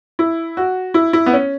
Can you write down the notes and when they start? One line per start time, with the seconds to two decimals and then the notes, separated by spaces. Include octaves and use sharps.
0.19 E4
0.57 F#4
0.94 E4
1.13 E4
1.26 B3
1.33 C#4